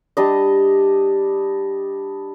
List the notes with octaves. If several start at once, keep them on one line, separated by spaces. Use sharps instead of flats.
G3 D4 D#5